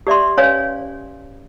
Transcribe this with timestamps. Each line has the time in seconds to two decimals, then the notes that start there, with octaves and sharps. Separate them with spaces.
0.07 G4 D5 E5 C6
0.37 C#4 B4 C#5 D5 F5 G#5